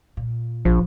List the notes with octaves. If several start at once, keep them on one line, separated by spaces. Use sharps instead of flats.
A#2
A#1 F3